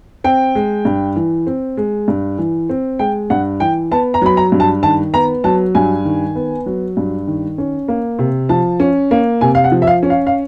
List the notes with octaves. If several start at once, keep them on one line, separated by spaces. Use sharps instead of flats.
C4 G5
G#3
G2
E3
C4
G#3
G2
E3
C4
G#3 G5
G2 F#5
E3 G5
B3 A5
A#5
F#3 B5
A#5
G2
A5
D#3 A5
B3 A#5
F#3 A5
G2 G#5
D#3
B3
F#3
G2
D#3
C#4
A#3
C3
F3 A5
C#4
A#3
C3 G#5
F5
F#5
F3
E5
F5
C#4
F5
F5